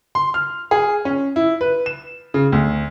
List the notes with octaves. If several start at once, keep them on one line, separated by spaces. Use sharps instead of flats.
C6
F6
G#4
C#4
E4
B4
E7
C#3
D2